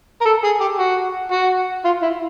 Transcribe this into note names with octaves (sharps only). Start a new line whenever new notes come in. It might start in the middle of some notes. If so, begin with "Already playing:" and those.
A#4
A4
G#4
G4
F#4
F#4
F4
E4